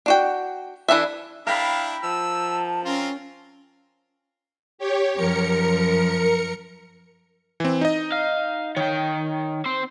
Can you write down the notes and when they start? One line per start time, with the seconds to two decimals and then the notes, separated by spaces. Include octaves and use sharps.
0.06 D4 F#4 G5
0.89 E3 D4 A4 E5
1.47 D4 E4 A#4 F5 G5 B5
2.03 F3 A5 E6
2.85 C4 C#4 F4 A#4
4.78 G4 C#5
5.15 F#2 F3 A#4 C#7
7.60 E3 C4
7.81 D#4 D#5
8.12 F5
8.77 D#3 C#5 G5
9.66 C4 C5